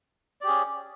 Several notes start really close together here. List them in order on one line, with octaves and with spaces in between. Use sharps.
D5 G4 G#4 C#4